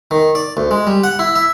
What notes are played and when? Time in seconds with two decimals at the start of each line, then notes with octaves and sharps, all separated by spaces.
0.11 D#3
0.35 D5
0.57 D2
0.71 G#3
0.87 G3
1.04 F#5
1.19 E4
1.35 E5